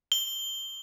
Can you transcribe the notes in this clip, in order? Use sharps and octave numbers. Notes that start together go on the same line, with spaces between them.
G7